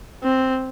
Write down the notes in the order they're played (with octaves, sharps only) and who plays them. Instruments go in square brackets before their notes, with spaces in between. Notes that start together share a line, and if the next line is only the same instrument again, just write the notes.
[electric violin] C4